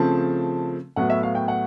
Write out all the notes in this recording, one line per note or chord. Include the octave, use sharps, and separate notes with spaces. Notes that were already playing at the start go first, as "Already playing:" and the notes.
Already playing: C#3 F3 A3 C4 A5
A2 F#3 B3 F#5
E5
F5
G5
F#5